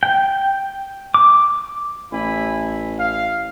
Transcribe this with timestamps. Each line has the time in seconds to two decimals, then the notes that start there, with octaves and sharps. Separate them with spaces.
0.03 G5
1.14 D6
2.12 A1 E4 G#5 B5
2.99 F5